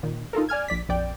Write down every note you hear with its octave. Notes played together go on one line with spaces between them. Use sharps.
A#2 D#3
D#4 F4 A4 A#4
D5 G#5 F6 G#6
A#1 D5 B6
A#1 F2 D5 G5